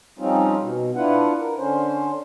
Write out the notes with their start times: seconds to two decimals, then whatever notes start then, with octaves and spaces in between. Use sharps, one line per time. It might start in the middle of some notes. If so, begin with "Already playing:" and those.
0.19 F3 G3 C4 C#4 D#4 F4
0.61 B2
0.95 D4 E4 F4 B4 F#5
1.39 A#4
1.57 D3 C#4 C5